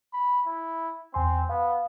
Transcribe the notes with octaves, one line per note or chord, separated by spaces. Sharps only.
B5
E4
E2 C4 G#5 C6
B3 F5